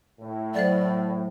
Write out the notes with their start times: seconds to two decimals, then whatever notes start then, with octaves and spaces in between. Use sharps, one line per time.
0.20 A2
0.54 F#3 A4 C5 D5